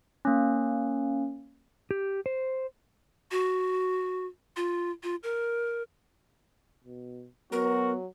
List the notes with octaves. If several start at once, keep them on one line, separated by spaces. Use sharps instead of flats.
A#3 C#4
G4
C5
F#4
F4
F4
A#4
B2
F#3 B3 F#4 A#4